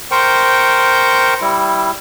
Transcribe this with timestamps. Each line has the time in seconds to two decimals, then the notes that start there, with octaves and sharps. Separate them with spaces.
0.11 A#4 C5 G5 C#6
1.41 G3 E4